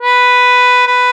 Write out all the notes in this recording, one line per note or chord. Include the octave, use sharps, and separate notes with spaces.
B4
B4